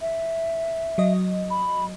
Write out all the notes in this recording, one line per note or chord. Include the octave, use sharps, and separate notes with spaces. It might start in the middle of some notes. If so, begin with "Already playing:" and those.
E5
F#3 D#5
B5